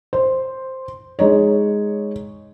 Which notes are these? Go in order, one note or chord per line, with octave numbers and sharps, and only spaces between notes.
C5
G#3 D#4 C#5